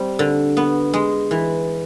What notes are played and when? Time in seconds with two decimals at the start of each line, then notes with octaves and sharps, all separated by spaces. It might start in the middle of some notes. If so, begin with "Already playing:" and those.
Already playing: G3 C4
0.19 D3
0.57 B3
0.94 G#3
1.31 E3